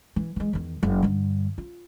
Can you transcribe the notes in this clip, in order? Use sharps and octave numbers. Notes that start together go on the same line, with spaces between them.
E3
E3 G#3
E2 D#3
F#1
G2 D3
F4